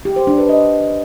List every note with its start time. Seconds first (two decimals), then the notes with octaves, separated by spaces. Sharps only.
0.05 G4
0.16 C5
0.27 D4
0.38 B4
0.49 D#5